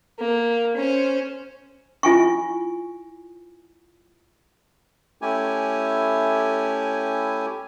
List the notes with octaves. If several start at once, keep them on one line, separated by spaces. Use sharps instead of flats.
A#3
C#4 C5
E4 F4 G#5 C#6
A3 C#4 E4 G4 G#5